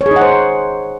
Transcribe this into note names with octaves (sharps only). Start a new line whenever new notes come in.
C#5
G#4
D#4
F#5
C5